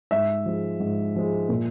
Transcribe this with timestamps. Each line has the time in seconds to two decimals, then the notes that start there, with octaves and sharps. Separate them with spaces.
0.11 G#2 E5
0.45 F3 G#3
0.80 G#2
1.16 F3 G#3
1.49 A#2